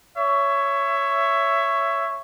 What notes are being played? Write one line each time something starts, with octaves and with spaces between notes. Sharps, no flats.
C#5 E5